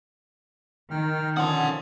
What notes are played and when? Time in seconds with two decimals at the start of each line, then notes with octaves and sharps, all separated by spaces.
0.91 D#3 G5 F6
1.37 D3 F3 C#4 F#5 A5 C6 D#6